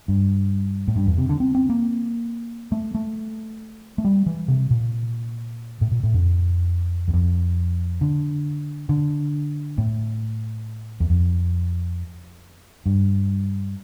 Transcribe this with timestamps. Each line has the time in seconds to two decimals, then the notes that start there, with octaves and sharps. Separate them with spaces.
0.08 G2
0.88 A2
0.96 G2
1.07 E2
1.18 C3
1.29 D3
1.40 C4
1.55 C4
1.69 A#3
2.72 A3
2.95 A3
3.98 A3
4.04 G3
4.26 E3
4.48 C3
4.70 A#2
5.81 A2
5.91 A#2
6.03 A2
6.14 F2
7.08 E2
7.14 F2
8.01 D3
8.89 D3
9.78 A2
11.00 E2
11.10 F2
12.86 G2